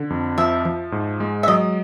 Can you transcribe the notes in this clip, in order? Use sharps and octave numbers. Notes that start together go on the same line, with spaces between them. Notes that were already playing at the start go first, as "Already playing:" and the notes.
Already playing: D3
F2
F3 E5
F3
G#2
G#3
E5
F#3 D#5